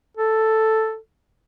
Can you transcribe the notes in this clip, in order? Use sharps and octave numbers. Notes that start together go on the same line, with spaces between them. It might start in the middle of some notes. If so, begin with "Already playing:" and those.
A4